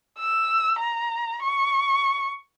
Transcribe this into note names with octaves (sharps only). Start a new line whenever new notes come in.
E6
A#5
C#6